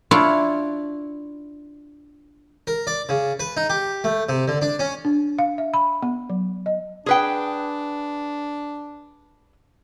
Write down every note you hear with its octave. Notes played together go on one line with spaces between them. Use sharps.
D4 E4 F4 C#5
A#4
D5
C#3
B4
D#4
G4
A3
C3
D3
D4
C#4
D4
F5
E5
B5
B3
F#3
D#5
D4 G#4 B4 G5